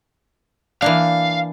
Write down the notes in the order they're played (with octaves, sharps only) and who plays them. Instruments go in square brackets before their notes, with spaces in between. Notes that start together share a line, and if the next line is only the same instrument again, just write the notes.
[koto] E3 A#3 D4 [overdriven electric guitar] F5